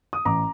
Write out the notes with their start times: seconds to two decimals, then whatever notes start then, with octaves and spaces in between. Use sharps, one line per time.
0.13 D#6
0.25 A1 A#5 D6